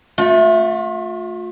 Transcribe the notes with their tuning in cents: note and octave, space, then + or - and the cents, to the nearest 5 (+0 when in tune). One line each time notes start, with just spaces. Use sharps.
A3 +0 F4 +40